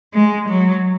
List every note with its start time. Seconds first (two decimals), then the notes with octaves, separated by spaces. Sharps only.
0.14 G#3
0.48 F#3